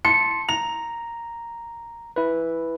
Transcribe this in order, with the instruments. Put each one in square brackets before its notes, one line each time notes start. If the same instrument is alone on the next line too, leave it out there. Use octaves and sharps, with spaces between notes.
[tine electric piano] A5 C6 [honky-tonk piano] C#7
[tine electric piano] A#5 [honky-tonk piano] F7
[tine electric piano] E4 B4